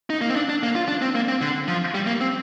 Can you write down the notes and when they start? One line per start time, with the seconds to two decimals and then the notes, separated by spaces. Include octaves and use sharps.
0.10 D#4
0.21 A#3
0.29 C4
0.36 D4
0.49 D4
0.63 A#3
0.75 F4
0.88 D4
1.02 C4
1.15 A#3
1.28 C4
1.41 D3
1.68 F3
1.94 G3
2.06 A#3
2.21 C4